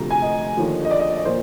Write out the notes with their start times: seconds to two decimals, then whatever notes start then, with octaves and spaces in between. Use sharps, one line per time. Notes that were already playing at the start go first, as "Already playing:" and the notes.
Already playing: D2 C3 F3 A#5
0.11 G#5
0.22 D#5
0.57 D#2 D3 F3
0.85 D#5
0.91 D5
1.00 D#5
1.17 D#5
1.25 A#2 F3 C5